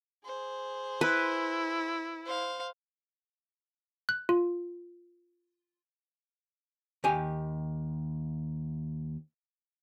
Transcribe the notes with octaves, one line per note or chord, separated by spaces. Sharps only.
G#4 C5
E4 B4
C5 F5
F#6
F4
D#2 G4 G#5